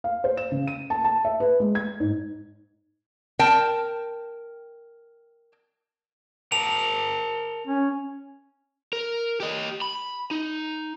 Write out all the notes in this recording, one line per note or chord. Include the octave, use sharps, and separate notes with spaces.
F5
C5
E7
C#3
D#7
A5
A5
E5
B4
G#3
G#6
G#2
A#4 G5 A5
A#4 G5 A5 F7
C#4
A#4
G4 D#5
B5
D#4